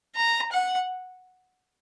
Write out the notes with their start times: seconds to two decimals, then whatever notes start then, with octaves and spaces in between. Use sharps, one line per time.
0.16 A#5
0.52 F#5